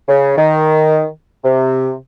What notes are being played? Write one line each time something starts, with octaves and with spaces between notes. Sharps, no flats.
C#3
D#3
C3